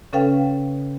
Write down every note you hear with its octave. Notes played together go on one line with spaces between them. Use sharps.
C#3 C#4 A4 B4 F5 G5